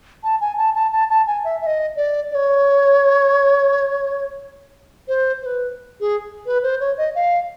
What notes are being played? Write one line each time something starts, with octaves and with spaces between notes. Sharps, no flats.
A5
G#5
A5
A5
A5
A5
G#5
E5
E5
D#5
D5
D5
C#5
C5
C5
B4
G#4
B4
C5
C#5
D#5
F5